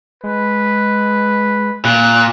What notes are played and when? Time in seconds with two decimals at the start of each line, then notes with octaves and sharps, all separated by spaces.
0.24 G#3 B4
1.85 A#2 F#6